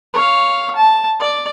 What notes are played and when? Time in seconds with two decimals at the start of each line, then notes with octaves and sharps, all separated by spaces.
0.14 C#5 F5
0.76 A5
1.20 D5